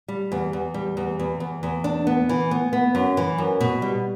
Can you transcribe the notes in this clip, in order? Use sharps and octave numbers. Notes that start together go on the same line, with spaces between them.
G3
E2
E2
G3
E2
E2
E2
E2
D4
B3
E3
B3
B3
F#2
E3
F#2
B2
G3